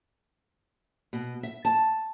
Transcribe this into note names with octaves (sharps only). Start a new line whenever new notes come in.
B2
E5
A5